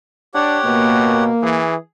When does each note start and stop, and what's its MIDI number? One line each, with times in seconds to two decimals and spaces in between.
0.34 0.58 62
0.34 1.24 67
0.34 1.24 73
0.34 1.24 78
0.65 1.30 47
0.65 1.64 58
1.42 1.75 52
1.42 1.74 68